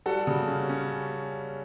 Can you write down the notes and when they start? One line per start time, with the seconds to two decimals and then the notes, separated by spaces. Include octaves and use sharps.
0.06 G3 F#4 A4
0.27 C#3
0.48 C#4
0.69 C#4